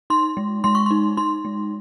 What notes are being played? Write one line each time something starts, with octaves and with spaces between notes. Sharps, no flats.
D#4 C6
G#3
G#3 C6
C#6
D#4 C6
D#4 C6
G#3